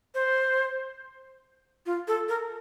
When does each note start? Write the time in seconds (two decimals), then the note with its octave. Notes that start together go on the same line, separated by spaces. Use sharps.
0.15 C5
1.86 F4
2.08 A4
2.29 A#4